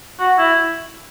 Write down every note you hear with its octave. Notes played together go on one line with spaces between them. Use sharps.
F#4
E4